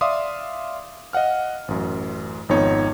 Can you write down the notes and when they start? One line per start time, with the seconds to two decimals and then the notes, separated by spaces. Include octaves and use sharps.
0.01 D5 E5 F5 C6 D6 D#6
1.13 D#5 F5 F#5 F6
1.68 A1 F#2
2.49 G#1 F2 B3 D#4 C#5